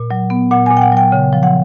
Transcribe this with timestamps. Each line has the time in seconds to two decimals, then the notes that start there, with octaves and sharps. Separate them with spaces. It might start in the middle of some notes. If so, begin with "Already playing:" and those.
Already playing: A#2
0.11 F#3
0.30 B3
0.51 A#2 F#5
0.66 A#2 G#5
0.77 G5
0.82 F#5
0.92 F#3 G5
1.12 C#3
1.33 F3
1.43 F#5